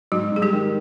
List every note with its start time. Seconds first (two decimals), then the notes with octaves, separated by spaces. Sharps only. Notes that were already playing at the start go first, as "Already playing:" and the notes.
0.12 G#2 F#3 F#4
0.32 G#2 G#4
0.42 G3 G4
0.53 D#3